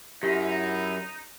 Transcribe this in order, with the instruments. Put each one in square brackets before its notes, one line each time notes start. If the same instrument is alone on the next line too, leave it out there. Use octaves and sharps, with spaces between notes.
[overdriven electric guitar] F#2 [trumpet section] D#4 [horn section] E4 [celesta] G4